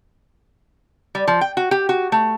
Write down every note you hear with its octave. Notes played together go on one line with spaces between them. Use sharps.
G3
F3
G5
F#4
G4
F#4
A3